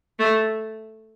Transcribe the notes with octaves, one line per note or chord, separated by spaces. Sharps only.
A3